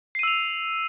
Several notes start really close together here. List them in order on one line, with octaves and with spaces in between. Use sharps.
C7 D#7 E6 F7